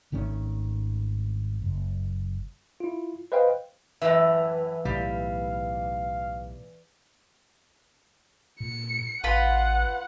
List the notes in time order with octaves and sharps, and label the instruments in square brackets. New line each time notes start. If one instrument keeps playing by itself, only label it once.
[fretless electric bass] G#1 D#3 A3 C#4
F#1
[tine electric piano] E4 F4
B4 C5 D#5 F5 G5
[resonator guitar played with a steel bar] F#2 A2 E5 [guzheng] E3
[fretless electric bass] B1 A2 [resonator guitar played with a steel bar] G3 [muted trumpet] F5
[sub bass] A#2 [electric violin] C#7
[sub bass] A1 [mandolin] F4 B4 B5 [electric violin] F#5